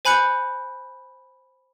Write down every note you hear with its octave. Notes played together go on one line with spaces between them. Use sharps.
C5 G#5 B5 F#6 G6 C#7